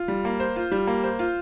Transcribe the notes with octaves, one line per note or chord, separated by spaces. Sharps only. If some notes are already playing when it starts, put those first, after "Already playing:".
Already playing: F4
G3
A#3
C5
F4
G3
A#3
C5
F4